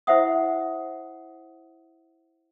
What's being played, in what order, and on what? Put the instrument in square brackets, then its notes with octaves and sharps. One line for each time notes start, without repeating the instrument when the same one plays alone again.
[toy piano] E4 C5 E5 F#5 D#6